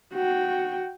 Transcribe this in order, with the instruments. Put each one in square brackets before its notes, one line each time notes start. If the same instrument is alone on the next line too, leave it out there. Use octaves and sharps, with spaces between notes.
[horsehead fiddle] F#4 G5